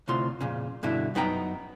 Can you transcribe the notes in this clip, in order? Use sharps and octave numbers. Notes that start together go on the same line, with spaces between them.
D2 A2 C3 F4 C6
F2 A#2 C#3
G2 B2 D3 E4
F#2 B3 D#4 G5 A#5